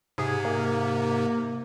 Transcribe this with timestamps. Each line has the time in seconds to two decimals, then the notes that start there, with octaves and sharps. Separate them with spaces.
0.18 G#2 C3 G#4
0.44 A#3